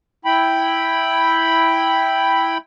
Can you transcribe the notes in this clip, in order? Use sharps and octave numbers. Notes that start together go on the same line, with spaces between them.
E4 G5 B5